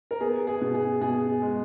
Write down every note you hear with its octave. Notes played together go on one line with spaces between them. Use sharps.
A#4
B3 G#4
G#4
B2
G#4
B2 G#4
G#3